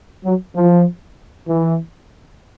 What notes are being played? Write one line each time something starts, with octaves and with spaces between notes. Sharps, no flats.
F#3
F3
E3